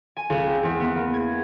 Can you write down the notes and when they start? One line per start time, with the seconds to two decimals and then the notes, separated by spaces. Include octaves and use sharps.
0.16 G#5
0.30 C#2
0.47 C4
0.63 E2
0.80 B3
0.95 A#3
1.14 G#6